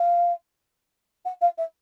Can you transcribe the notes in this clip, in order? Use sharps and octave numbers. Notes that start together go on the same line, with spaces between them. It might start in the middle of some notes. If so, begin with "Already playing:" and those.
Already playing: F5
F#5
F5
E5